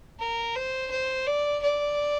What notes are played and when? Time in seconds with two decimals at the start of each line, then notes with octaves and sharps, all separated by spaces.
0.19 A#4
0.56 C5
0.91 C5
1.27 D5
1.62 D5